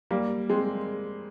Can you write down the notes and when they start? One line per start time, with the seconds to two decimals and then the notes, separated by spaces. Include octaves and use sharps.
0.11 G3 A#3
0.50 G#3 C4